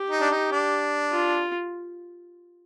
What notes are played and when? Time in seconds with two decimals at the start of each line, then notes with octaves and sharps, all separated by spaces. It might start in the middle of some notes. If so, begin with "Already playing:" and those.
Already playing: G4
0.10 D#4
0.20 D4
0.31 D#4
0.51 D4
1.11 F4